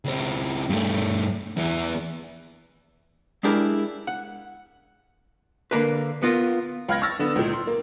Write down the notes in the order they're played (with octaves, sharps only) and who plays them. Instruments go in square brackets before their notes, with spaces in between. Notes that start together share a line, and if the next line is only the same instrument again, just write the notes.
[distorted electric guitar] C#2 C4
G2 A3
E2 E3
[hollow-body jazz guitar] G#3 D4 E4 G4 A#4 D5
F#5
D3 A#3 B4
B3 F4 A#4
[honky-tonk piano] C#2 F5 B5 F6 G#6 A#6
C#6 E6 F6 A6 A#6
D3 B3 E7
C#2 A#2
C6
A#3